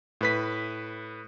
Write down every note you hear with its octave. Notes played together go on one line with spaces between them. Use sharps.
A2 B4 B6